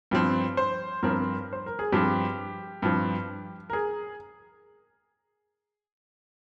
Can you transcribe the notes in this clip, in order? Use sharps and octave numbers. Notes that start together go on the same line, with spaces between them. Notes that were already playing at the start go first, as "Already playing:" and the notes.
G2 F3 C4
C5
G2 F3 C4 A#4
C5
A#4
C5
A#4
G#4
G2 F3 C4 G4
G2 F3 C4
A#4
G#4